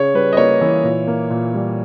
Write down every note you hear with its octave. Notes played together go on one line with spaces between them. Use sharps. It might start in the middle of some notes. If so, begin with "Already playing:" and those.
Already playing: C#3 C#5
G3 B4
D#5
A#3 C#5
E3
A#2
A#3
A#2
G3